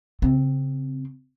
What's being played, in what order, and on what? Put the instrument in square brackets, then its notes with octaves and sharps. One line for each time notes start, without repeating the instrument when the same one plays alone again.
[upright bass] C#3 C4